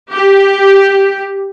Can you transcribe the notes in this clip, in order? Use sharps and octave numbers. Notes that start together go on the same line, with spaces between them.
G4